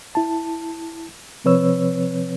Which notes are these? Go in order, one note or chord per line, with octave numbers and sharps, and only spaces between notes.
E4 A5
C3 F3 C4 B4 C#5 E6